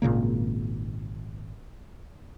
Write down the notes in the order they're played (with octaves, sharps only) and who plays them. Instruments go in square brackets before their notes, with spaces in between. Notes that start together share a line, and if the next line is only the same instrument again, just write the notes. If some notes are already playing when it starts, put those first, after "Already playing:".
[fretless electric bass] G#1 A#2 C#3 A#3